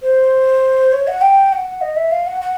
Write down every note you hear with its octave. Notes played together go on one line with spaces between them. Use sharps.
C5
C#5
F#5
G5
F#5
D#5
E5
F5
F#5
F#5